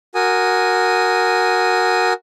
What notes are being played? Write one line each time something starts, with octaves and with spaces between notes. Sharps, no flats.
F#4 A#4 G#5 D#6